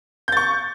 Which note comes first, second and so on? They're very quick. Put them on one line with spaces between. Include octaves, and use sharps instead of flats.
G6 A6 C#6